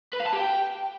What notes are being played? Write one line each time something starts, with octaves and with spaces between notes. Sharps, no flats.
B4
F5
A5
G4
G5